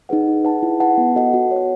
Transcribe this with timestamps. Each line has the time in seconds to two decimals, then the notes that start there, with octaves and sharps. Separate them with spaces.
0.09 D#4 G#4 B4 F#5
0.27 G#4
0.45 B4 F#5 A5
0.63 E4
0.80 B4 F#5 A5
0.98 B3
1.16 F#4 A4 D#5 F#5
1.34 F#4
1.51 C#5
1.56 F#5